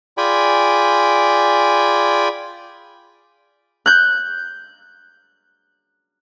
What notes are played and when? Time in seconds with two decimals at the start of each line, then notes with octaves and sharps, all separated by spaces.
0.18 F4 G#4 D5 G5 G#5 B5
3.86 F#6 G6